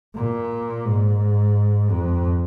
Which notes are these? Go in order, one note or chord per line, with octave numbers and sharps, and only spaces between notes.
A#2
G#2
F2